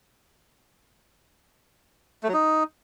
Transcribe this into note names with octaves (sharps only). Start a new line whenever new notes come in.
A3
F#3
D#4